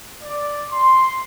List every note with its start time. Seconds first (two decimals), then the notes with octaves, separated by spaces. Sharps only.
0.23 D5
0.70 C6